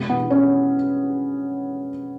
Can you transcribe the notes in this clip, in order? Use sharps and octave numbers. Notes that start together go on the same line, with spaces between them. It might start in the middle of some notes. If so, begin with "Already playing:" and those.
Already playing: B2 G#3
B3
C#4